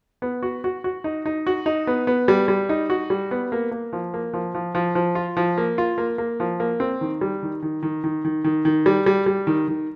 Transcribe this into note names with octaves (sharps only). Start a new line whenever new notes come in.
B3
F#4
F#4
F#4
D#4
D#4
F#4
D#4
B3
B3
G3
G3
D#4
F#4
G3
B3
A#3
A#3
F3
A#3
F3
F3
F3
F3
F4
F3
A#3
F4
A#3
A#3
F3
A#3
C4
D#3
G3
D#3
D#3
D#3
D#3
D#3
D#3
D#3
G3
G3
G3
D#3
D#3